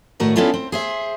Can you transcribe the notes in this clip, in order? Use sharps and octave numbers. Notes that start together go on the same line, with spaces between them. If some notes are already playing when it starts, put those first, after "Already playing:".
A2 D#3 A3 F#4 A#4 D5
B3 C#4 D4 E4 F4 A4
C4
G#4 C5 E5